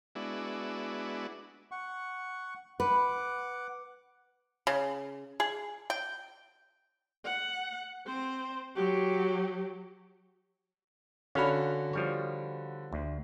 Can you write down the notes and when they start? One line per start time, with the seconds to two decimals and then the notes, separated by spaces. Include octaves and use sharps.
0.15 G#3 B3 D4 E4 F#4
1.71 F#5 C#6
2.80 B4 F#5 D6
4.67 C#3
5.40 G#4
5.90 G5
7.25 F#5
8.06 C4 C5
8.76 F#3 G4
11.35 D3 C#4 F#4 C#5 F5 B5
11.93 F3 G3 C#5
12.93 D2